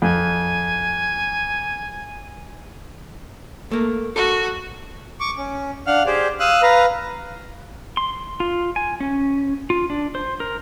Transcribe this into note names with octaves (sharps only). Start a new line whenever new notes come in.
F2 G#5
A3 A#3
F#4 A4
C#6 D6
C#4
D4 F5 F#5 F6
G4 G#4 C5 D5
F5 D#6 E6 F#6
B4 F5 A#5
C6
F4
G#5
C#4
F4
D4
C5
A#4